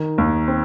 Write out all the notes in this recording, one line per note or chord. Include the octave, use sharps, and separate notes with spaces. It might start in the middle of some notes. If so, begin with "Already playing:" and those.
Already playing: D#3
D#2
C4